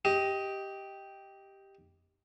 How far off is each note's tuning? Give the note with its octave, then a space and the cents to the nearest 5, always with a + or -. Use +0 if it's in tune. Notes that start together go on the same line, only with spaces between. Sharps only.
G4 +0 D#5 +15